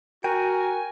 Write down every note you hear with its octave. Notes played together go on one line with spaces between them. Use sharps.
F#4 A#4 G5 G#5